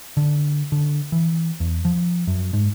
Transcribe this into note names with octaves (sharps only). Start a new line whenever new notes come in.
D3
D3
E3
E2
F3
F#2
G#2